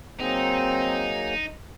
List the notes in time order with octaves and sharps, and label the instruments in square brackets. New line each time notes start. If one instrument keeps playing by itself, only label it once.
[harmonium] F#3 A#3 G#4 [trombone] C4 [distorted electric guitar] D#4